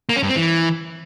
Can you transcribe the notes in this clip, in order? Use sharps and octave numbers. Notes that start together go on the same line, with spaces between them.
A#3
C#4
G2
C4
E3